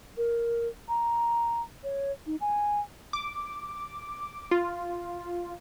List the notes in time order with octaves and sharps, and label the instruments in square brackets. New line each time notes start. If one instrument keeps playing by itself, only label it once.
[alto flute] A#4
A#5
C#5
D#4
G#5
[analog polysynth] D6
F4